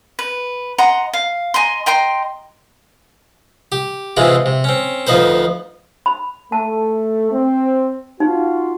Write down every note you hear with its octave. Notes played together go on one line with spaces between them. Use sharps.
B4
D#5 F#5 A#5 C6
F5
D#5 G#5 A#5 C6
D#5 G5 A#5 C6
G4
G#2 C3 E3 G#3 E4 F4
C3
C4 C#4
D2 F3 D#4 B4 C5
B5
A3 A5
C4
D#4 F4 F#4